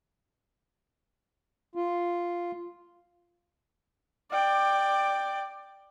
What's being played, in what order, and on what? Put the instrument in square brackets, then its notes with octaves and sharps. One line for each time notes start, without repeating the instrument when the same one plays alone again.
[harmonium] F4
[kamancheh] D5 G5